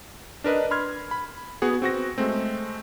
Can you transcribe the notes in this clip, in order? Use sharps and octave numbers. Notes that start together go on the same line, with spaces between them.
D4 A#4 B4 D#5
B5 C6 F6 G#6
B5
B3 F#4 G#4
C4 F#4 A#6
G#3 A3 C4